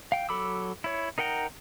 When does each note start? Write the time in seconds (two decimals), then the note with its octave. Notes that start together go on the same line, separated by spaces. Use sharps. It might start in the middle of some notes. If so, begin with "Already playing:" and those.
0.12 F5 G5
0.29 F#3 A4 B5 D6 E6
0.84 E4 C#5
1.18 D#4 A#4 F#5 G5 A#5